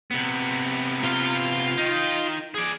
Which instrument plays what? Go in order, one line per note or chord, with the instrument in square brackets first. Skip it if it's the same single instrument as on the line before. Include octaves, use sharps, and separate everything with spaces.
[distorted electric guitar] C3 B3
[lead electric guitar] F4 F5
[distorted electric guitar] D#3 D#4
G#4 D5